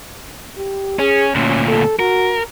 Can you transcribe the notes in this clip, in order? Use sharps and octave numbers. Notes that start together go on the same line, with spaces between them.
G4
C#4 G#4
D2 A#2 C#4
A4
F#4 A#4